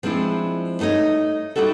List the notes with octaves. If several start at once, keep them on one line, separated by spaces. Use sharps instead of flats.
F3 G#3 C4 D4 E4
A3 D#4 C#5 D#5
G3 D#4 E4 F#4 A4